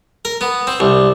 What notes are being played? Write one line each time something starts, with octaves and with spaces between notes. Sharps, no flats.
A#4
B3
C4
C2